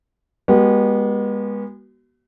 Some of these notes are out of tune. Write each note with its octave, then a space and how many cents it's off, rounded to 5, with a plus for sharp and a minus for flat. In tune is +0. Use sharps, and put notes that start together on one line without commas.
G#3 -30 B3 -35 F#4 +40